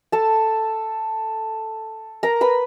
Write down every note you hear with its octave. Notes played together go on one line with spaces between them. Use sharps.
A4 A5
A#4 A#5
B4 B5